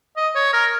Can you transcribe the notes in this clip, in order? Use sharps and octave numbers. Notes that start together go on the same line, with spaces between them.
D#5
C#5
A#4